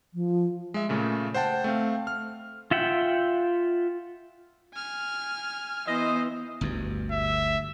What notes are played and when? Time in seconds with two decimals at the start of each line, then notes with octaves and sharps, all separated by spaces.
0.14 F3
0.74 G#3 E5
0.89 A#2 C#3 A3
1.34 C5 F#5 G5 A5
1.64 A3 C4 F5
2.07 F6
2.71 F4 E5 F#5 G5
4.74 G#5 F6
5.87 E3 B3 C5 D#5
6.61 G1 D2 G2
7.11 E5